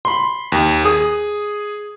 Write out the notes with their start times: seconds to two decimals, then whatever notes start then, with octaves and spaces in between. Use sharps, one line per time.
0.05 B5 C6
0.52 D#2
0.84 G#4 D#6